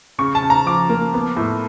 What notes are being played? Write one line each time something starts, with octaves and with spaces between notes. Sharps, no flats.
C#3 C#6
A5
C#3
A#5
F3 D6
A#3
B3
A2